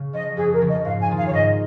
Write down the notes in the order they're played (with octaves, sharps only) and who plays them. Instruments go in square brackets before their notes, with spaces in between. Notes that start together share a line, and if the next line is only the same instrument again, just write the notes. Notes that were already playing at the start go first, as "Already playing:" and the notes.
Already playing: [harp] C#3
[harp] F3 C#4 [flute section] D#5
[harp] F2 [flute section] G#4
[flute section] A#4
[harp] C#3 F3 G#3 C#4
[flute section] D#5
[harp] G#2 [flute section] F5
[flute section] G#5
[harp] D#3 A#3 F4 G#4
[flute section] F5
C#5
[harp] G#2 [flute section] D#5